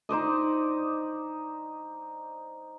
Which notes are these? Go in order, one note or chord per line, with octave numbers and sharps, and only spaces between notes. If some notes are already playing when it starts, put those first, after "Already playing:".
D#4 C5 D5 D#5